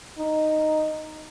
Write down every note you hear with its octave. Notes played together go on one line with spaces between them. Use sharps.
D#4